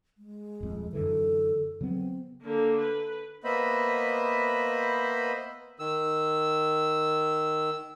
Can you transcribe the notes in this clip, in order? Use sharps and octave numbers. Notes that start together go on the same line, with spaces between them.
G#3
D#1 F2
F#2 D3 E3 A4
C#3 F#3 B3 C4
D3 A#3
B4
A#3 B3 C5 D#5 E5 B5
D#3 E6